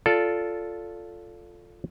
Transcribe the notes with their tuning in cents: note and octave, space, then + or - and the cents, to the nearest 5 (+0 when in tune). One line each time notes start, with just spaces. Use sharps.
F4 +0 A4 +0 D5 -20